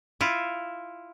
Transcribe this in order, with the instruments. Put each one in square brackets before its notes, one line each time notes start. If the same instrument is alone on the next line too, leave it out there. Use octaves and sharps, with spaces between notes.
[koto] E4 F4